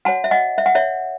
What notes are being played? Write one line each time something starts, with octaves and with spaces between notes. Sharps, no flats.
F#4 C#5 F#5 A5
E5
D#5 F#5
E5
F#5
C#5 E5